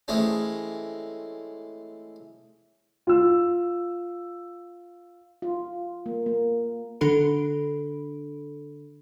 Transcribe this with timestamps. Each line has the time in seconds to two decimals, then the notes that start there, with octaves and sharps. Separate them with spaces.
0.08 E3 G#3 A3 C4 C#4
3.07 F4 E6
5.42 F4
6.06 A#3
6.26 A#3
7.01 D3 D4 A4 B5 D7